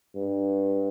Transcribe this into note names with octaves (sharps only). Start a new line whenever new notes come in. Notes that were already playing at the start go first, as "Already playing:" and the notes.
G2